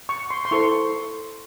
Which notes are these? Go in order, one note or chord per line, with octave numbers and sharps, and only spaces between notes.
C#6
C6
C6
E4 A4 C5 C#6